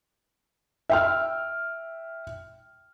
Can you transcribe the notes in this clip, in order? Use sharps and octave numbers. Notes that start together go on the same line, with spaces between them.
E5 G5 F6